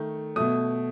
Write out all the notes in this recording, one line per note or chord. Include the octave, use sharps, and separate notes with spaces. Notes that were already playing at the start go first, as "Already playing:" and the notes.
Already playing: D#3 A3
B2 A3 D#6